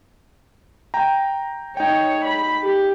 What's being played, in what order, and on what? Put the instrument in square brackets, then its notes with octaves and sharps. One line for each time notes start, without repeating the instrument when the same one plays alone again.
[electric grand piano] G5 A#5
[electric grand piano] D#4 G5 [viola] C#5
[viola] B5
G4